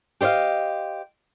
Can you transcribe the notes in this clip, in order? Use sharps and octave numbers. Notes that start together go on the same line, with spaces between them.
G4 C5 D5 D#5 F5